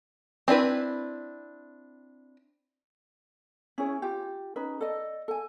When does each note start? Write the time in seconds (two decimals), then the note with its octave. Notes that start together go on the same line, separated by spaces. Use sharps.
0.48 C4 D4 E4 B4
3.78 C#4 E4 G#4 C#5
4.02 F4 G4
4.56 C#4 D#4 B4
4.81 A4 D5 D#5
5.28 A4 G#5